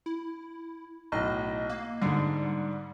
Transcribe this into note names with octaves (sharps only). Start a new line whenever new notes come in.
E4
B1 A2 D#5
A#3
G#2 D3 G3